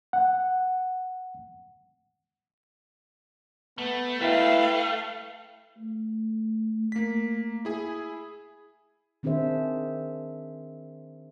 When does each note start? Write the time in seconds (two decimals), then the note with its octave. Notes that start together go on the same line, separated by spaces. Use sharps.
0.13 F#5
3.78 A3 B3
4.21 E4 B4 E5 F5 G5
5.78 A3
6.92 A#3 B6
7.65 E4 G#4 G#5
9.23 D#3 C4 D4 G#4 C5 E5